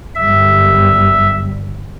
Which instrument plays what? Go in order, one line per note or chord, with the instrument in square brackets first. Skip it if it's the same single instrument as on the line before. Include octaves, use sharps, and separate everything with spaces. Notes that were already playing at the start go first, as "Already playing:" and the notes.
[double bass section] G1 F#2 G3 [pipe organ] E5